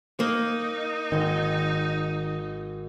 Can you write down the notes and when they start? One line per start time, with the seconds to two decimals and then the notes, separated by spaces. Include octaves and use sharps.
0.20 A#3 D#4
1.12 G#1 D#3 G5 G6